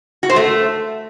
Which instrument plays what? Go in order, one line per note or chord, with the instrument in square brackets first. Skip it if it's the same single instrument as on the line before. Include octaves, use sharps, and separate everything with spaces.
[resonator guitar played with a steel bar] F#4
C5
A3